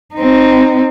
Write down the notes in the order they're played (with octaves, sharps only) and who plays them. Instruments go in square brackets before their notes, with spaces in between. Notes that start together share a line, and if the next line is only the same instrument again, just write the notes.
[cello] C4 D#4